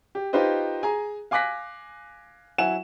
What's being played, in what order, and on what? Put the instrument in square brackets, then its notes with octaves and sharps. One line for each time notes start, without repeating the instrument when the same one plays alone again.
[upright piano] G4
D#4 F4 G4 B4 C5 D#5
G#4 G#5 A#5
F5 G#5 D6 F#6 A#6 B6
F#3 E4 F#5 G#5 E7